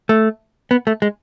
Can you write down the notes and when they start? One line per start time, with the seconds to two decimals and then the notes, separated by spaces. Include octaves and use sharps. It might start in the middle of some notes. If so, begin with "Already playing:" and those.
0.09 A3
0.71 B3
0.87 A3
1.02 G#3